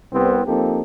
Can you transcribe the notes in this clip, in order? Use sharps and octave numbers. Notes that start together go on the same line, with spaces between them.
C2 B3 C4
F3 A#3 C4 D#4 G4 A4